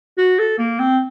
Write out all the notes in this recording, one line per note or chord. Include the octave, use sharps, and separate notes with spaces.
F#4
A4
A#3
C4